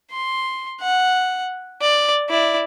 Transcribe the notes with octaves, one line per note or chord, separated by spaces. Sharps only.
C6
F#5
D5
E4 D5